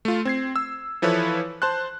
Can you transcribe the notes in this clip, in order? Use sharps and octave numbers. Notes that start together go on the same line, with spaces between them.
A3 F4
C4 G#6 C7
E6
E3 F3 E4 A4 B4 C#5
C5 A5 C6 F#6